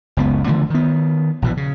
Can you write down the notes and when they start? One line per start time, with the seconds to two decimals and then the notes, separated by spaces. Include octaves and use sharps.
0.17 F#1 C#2 B3
0.46 D3 E3 F3 A3
0.70 D#3 B3
1.42 A#1 B2 E3
1.57 C#3